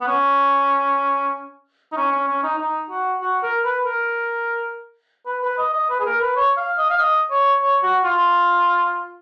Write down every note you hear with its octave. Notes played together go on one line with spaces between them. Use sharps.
B3
C#4
D#4
C#4
C#4
C#4
D#4
D#4
F#4
F#4
A#4
B4
A#4
B4
B4
D#5
D#5
B4
G#4
A#4
B4
C#5
F5
D#5
F5
D#5
C#5
C#5
F#4
F4